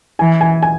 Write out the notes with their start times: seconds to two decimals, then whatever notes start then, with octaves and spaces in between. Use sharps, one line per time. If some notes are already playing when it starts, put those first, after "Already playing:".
0.19 E3 G#5
0.41 G#5
0.63 G#5